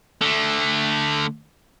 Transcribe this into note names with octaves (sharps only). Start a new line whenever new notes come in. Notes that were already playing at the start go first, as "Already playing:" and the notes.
D3 A3